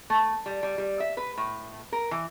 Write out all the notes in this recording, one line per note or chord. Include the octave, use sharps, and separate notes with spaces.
A3
G3
G3
G3
E5
B4
A2
A#4
E3